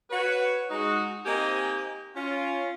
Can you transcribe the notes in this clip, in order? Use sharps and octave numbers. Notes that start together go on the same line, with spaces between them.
F#4 B4 C#5
G#3 D#4 F#4
A#3 C4 D#4 G4 D#5 G#5
C#4 F4